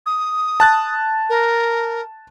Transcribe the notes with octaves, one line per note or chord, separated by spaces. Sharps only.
D#6
A5 F#6 A6
A#4